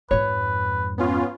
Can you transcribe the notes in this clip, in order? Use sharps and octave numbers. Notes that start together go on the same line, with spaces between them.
F2 G#2 B4 C#5
B3 C#4 F4